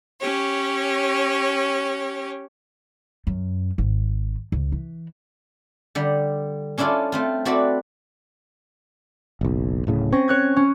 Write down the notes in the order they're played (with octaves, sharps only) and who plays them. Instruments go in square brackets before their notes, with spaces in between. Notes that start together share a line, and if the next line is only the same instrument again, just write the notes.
[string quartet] C#4 G4 C#5
[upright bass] F#2
G#1
C#2
E3
[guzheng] D3 G3
C#4 D4 E4 F4 A4
A3 C4 F4
C4 E4 F#4 A4 B4 D5
[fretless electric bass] F#1 B1
D1 A2 C#3
[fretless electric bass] C4 [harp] C#4 A#6
[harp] C#5 F#6 G#6
C#4